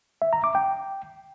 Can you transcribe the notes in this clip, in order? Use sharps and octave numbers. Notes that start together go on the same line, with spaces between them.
E5
A#5
D6
G5